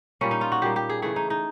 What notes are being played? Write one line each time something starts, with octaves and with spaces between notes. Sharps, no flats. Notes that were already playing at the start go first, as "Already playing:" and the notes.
A#2 G3 A#3 C#4
D#4
F4
F#4
A#2 G3 A#3 G4
G4
G#4
C#3 E3 A3 G#4
D#4
D#4